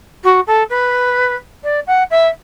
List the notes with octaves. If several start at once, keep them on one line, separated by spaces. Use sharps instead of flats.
F#4
A4
B4
D5
F#5
E5